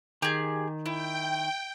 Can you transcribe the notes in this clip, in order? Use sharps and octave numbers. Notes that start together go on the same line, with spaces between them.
D#3 G4 G#4
E4 G5